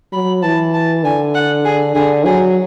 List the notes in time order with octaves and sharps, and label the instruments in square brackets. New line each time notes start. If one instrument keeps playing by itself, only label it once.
[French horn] F#3 [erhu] B5
[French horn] E3 [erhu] A5
[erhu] A5
[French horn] D3 [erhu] G#5
[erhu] F#5
G#4
[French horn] D3 [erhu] G#4
[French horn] F#3 [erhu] G#4